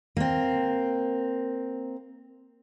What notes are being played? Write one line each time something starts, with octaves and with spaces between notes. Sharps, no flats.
A#3 C4